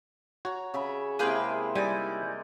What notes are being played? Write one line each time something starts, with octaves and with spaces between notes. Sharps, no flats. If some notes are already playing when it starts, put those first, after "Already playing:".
F#4 C#5 A#5
C#3 E5 B5
C3 G#3 A#3 E4 G#4 B4 G5
G3 D#4 D5 G#5